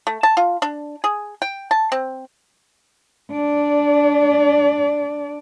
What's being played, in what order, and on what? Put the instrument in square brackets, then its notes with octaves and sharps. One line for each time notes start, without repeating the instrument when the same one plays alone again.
[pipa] A3
A5
F4
D4
G#4
G5
A5
C4
[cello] D4 D5